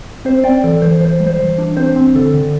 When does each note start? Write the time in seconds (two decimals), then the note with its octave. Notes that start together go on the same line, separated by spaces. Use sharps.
0.25 C4 C5
0.44 C4 D5 G5
0.63 E3 A4 D5
0.82 E3 C5
1.01 E3 C5
1.20 G3
1.27 C5
1.40 E3
1.58 D4
1.77 C4 C5
1.96 C4
2.15 D3 A4
2.34 D3